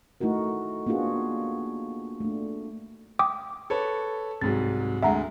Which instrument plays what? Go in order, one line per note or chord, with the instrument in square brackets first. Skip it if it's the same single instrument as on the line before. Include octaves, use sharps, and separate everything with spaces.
[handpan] A3 D#4 E4 F#4 A#4
A#3 B3 D4 F4 F#4 G#4
A3 D4
[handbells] G5 D6 D#6
[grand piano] A4 B4 C#5
[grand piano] C2 G#2 F#3 [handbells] A6
[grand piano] D2 G#3 [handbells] E5 F#5 A#5